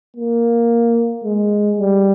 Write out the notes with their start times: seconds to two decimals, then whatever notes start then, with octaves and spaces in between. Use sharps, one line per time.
0.16 A#3
1.24 G#3
1.78 G3